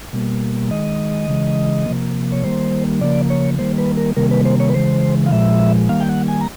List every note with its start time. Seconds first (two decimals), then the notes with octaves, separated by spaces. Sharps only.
0.13 B2 G3 A#3
0.71 D#3 G#3 D#5
1.28 C#3 E3 G#3
1.86 C3 F3 A#3
2.32 C#5
2.43 D#3 G3 A#3 C5
3.01 C#3 F3 A#3 D5
3.30 C#5
3.59 D#3 G3 A#3 C5
3.78 B4
3.97 A#4
4.16 C3 D#3 G3 A#3 A#4
4.31 B4
4.45 C5
4.60 C#5
4.69 B4
4.74 C#3 E3 G#3 C5
5.26 F5
5.32 A#2 F3 G#3 E5
5.89 D#3 G3 A#3 F5
6.00 G5
6.09 F#5
6.28 G#5
6.41 A#5